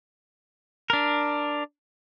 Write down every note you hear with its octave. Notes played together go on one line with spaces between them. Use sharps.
D4 A#4